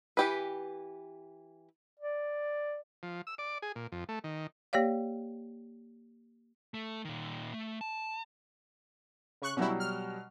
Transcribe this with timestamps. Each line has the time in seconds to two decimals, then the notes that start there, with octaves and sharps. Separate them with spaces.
0.17 E3 G4 B4
2.00 D5
3.03 F3
3.27 E6
3.38 D5
3.62 G#4
3.76 A#2
3.92 F2
4.09 A3
4.24 D#3
4.73 A#3 G4 C#5 D5 F5
6.74 A3
7.05 A#2 D#3
7.54 A3
7.81 A5
9.42 C#3 C#6 F#6
9.57 B2 F#3 G3 C#4 E4
9.80 F6